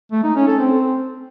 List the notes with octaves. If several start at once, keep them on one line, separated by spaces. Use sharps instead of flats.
A3
D#4
C#4
A4
C4